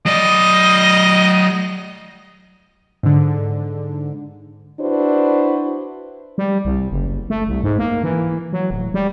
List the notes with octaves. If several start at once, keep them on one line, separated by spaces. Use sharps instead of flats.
F#3 D5 D#5
G#2 D3
D4 E4 F#4 B4 C5
G3
C2
F#1
A3
C2
G#2
A#3
E3
F#3
D1
G3